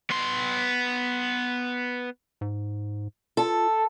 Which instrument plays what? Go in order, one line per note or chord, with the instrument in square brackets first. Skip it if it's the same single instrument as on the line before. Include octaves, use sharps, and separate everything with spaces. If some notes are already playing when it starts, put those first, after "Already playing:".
[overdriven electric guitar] B3 C6
[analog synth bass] G#2
[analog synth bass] F4 [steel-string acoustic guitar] A4